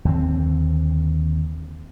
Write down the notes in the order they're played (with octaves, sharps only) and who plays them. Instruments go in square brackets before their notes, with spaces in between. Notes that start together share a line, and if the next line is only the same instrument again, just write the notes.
[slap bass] D#2 D3 C4